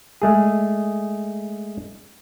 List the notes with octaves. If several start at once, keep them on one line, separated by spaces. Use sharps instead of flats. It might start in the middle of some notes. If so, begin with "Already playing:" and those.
G#3 A3 G#4